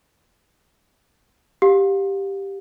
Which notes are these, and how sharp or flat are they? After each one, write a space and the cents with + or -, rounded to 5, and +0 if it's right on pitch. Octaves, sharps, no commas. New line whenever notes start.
G4 +0 F5 +30